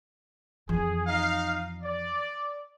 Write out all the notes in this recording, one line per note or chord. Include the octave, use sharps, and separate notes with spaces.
F2 E3 G#4
D#4 F5
D5